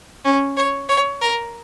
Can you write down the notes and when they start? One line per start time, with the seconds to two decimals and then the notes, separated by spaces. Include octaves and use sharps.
0.25 C#4
0.57 C#5
0.89 C#5
1.21 A#4